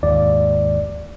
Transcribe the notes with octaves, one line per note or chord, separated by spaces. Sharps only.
D#2 G#2 D5